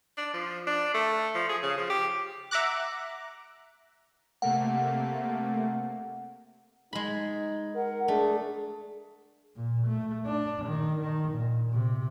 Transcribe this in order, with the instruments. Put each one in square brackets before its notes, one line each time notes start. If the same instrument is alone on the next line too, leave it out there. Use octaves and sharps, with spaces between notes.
[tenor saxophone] D4
F3
D4
A3
F3
G#4
C#3
F3
G4
[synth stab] E5 F#5 A#5 D6 F#6
[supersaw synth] C3 A3 A#3 [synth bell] F#5
[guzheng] G#3 B5 [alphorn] D#4
[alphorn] A#4 [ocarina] F#5
[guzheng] A3 [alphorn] D4 [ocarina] G#4
[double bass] A#2
A3
D4
D#3
D#3
A#2
C3